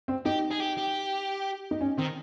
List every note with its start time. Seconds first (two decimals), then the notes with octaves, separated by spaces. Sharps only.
0.08 C4
0.25 D#4 G4
0.51 G#4
0.60 G4
0.77 G4
1.71 D#4
1.81 C#4
1.98 D#3 C4